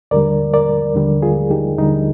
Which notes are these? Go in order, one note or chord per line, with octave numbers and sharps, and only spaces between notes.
D#2 D3 G3 A#4 D5
A#4 D5
D#2 D3 G3
F4 G#4
D#4 G4
D#2 D3 G3 D#4